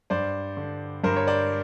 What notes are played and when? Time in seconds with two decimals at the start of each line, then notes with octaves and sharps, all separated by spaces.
0.10 G2 C5 D5
0.57 D3
1.04 G2 A#4 C5
1.16 C#5
1.27 C5 D5